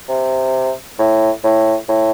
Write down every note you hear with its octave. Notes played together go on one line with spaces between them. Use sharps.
C3
A2
A2
A2